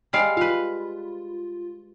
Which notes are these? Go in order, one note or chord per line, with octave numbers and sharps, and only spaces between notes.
G3 G#3 F5
F4 B4 F5